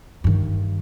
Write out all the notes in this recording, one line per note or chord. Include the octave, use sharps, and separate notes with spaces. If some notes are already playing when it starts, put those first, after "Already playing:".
G2 D#3